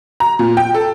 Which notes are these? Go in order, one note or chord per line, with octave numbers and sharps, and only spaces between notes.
A#5
A#2
G5
A4